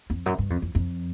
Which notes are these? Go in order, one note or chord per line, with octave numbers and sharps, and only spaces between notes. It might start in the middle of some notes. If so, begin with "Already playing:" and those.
F2
F#2
G2
F2
F2
F2